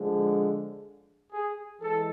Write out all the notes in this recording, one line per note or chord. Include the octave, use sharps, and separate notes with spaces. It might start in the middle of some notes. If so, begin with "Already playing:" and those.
Already playing: D3 F3 G#3
G#4
E3 G#3 A4